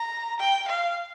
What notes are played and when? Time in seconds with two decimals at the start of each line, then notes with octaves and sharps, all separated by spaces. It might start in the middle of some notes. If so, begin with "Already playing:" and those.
Already playing: A#5
0.40 G5
0.68 F5